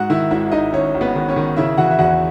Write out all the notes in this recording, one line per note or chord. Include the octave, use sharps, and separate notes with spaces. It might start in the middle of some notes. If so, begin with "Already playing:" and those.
Already playing: G#2 F#4 F#5
D#3 E4 E5
G#1 E4 E5
G#1 D#4 D#5
G#1 C#4 C#5
G#1
B3 B4
D#3
C#4 C#5
D#3
C#3 E4 E5
E3 F#4 F#5
E5
E2 F#4 F#5